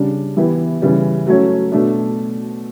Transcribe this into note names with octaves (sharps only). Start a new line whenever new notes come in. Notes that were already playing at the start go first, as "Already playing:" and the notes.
Already playing: C#3 G3 D4
E3 B3 E4 G4
C#3 E3 G3
F#3 A3 C#4 F#4 C#5
B2 A3 D4